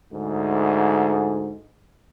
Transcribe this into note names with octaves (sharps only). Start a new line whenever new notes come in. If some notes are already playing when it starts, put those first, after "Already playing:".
D2 G#2